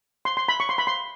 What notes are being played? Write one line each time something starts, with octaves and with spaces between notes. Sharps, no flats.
C6
C6
B5
C#6
C6
B5
C6